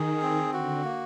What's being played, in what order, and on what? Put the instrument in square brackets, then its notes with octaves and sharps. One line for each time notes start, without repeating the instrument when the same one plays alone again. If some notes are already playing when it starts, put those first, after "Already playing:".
Already playing: [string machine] D#3 [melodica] G#4
[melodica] C4
[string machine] D3 [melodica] F#4
[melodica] A#3